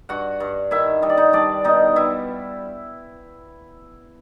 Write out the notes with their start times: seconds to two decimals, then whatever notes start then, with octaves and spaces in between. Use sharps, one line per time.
0.09 G2 F#4 F#5
0.40 G2
0.71 D#3 E4 E5
1.02 G3 D#5
1.10 D5
1.17 D#4 D#5
1.33 G3 D4 D5
1.64 B2 D#4 D#5
1.96 G3 E4 E5